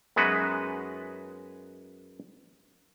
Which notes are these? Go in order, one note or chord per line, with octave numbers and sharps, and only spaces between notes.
F#2 G#3 B3 D#4 F#4 B4